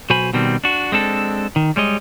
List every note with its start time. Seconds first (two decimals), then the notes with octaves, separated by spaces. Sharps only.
0.10 B1 F#4 C5 G#5 B5
0.33 B2 D#3 G3 C4
0.64 D4 F#4
0.92 G#3 C4 D4 A4
1.56 D#3
1.76 G3 G#3 C#5 D#5